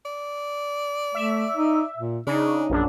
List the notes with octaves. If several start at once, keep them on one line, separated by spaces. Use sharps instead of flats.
D5
A3 E5
D#4
A#2
C#3 D4 D#4
A#1 F#2 D4